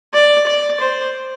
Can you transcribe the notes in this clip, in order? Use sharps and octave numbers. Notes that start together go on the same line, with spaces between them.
D5
D5
C5